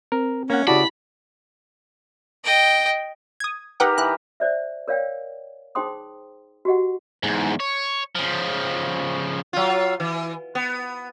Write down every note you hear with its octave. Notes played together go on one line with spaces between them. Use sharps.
C4 A#4
A#3 C#4 F#5
C#3 E4 F#4 G4 D5 A5 B5
D#5 G5
D#6 G#6
D#4 G4 A#4 B4 F#5 G5
E3 F#6
C5 D5 E5
A#4 C#5 D5 F5 G5
D#4 G#4 C5 G5 C6 D#6
F#4 G4 D#5 F#5
E2 G#2
C#5
C#3 F3
F#3 F4
E3
B3